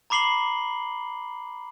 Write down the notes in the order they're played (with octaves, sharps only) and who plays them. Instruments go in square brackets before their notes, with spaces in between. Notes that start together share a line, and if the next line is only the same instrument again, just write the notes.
[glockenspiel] A#5 B5 D6 C7 F#7 G7